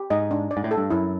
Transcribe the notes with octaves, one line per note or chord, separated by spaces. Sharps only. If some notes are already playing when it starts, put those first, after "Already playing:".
Already playing: G4
G#2 D#5
D4
D5
G#2
A2
A4
G2
F#2 E4